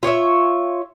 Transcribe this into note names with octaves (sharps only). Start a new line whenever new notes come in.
F4 C#5 D5 E5